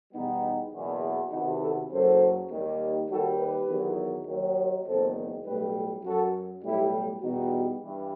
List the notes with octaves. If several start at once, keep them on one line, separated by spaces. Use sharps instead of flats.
E2 B2 G3 B3 D#4
F#1 E2 B2
E2 C3 D#3 D#4 F#4
F#4 A4
F#1 F#2 F#3 A4 C5
D#2 D#3 G3
D#2 D#3 G3 F#4 A4
G4 B4
E2 D#3 F#3
D#2 D#3 F#3
F#1 E2 D#3 A4 C5
B1 A2 G3 G4 B4
F#2 F#3 F#4 A4
B1 A2 G3 E4 G4
E2 B2 G3 D#4 F#4
G2 E3